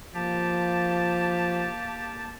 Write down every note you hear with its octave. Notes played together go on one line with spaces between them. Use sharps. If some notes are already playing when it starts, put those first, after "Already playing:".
F3 A#3 G4 A5